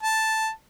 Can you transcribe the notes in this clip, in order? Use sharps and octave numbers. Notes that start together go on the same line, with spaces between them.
A5